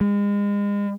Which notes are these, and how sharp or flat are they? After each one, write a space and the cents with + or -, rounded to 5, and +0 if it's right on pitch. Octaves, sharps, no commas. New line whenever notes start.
G#3 -35